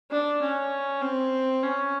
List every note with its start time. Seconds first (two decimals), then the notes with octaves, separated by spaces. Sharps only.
0.11 D4
0.41 C#4
1.02 C4
1.63 C#4